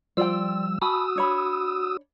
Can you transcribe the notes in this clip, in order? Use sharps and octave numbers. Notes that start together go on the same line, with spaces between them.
F3 G3 F4 D5 G5 E6
F#4 G#5 A5 B5 D#6 E6
D4 C#5 B5